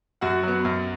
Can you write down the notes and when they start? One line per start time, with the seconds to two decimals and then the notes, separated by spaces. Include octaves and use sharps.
0.21 F#2 F#4 F#5
0.43 F#3 B3
0.65 F#2